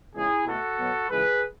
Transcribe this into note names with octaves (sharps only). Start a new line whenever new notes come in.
E2 C#3 G#3 E4 G#4
B2 A3 F#4 A4
B2 F#3 B3
C#2 C#3 E3 G#3 G#4 B4